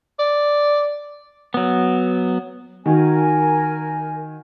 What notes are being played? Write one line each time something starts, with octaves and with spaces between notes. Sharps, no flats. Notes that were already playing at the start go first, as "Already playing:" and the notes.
D5
F#3 B3
D#3 F#4 A#4 G#5